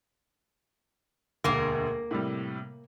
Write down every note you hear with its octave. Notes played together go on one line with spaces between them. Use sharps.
E1 D2 A#3 A#4
A2 C3 G3